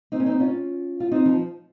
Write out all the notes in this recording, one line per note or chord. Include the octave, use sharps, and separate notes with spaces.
C4 D#4
C#4
C4 D#4
C#4 F4
F4
C4 D#4
F3